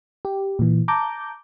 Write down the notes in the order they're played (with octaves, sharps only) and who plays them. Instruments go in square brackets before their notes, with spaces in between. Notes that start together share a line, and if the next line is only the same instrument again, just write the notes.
[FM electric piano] G4
A#2 E3
A5 A#5 D6 G6